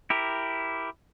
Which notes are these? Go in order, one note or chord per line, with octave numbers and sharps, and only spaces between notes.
E4 G4 A#4